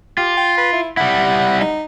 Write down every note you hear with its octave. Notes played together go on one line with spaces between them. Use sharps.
F4 G4
G5
B4
E4
G3 E4 F#5
D#4